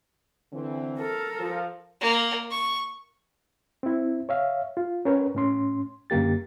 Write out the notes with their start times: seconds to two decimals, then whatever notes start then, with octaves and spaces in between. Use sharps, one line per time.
0.52 D3 E3 C4
0.99 A4 A#4
1.39 F3
2.01 A#3
2.51 C#6
3.83 C4 E4
4.29 C#5 E5 F5
4.77 F4
5.05 C#4 A#4 B4 C#5
5.35 A2 C#4 C6
6.10 F#2 D3 A#3 G4 A6